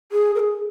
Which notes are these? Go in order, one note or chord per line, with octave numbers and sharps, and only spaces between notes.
G#4
A#4
G#4